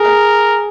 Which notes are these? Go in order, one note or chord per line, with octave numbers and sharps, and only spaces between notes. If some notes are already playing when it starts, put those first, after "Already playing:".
Already playing: G#4 A#4